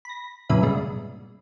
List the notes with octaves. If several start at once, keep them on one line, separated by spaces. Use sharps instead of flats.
B5 A#6
F#2 A#2 C#3 B4 E5
G2 B2 G#3